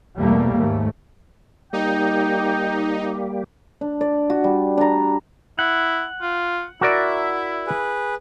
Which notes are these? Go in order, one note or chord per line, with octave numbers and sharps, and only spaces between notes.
E2 B2 G3 A3 A#3
D#2 G#2 A3
G3 A#3 D#4 G4 G5
D4
D5
F#4
G3
D4 A#5
E4 F#5
F4
E4 F#4 A#4 D5 E5
G#4 B4